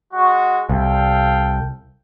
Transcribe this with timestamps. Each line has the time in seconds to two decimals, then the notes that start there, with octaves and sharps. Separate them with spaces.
0.13 G#3 F#4
0.69 C2 A4 F5 G5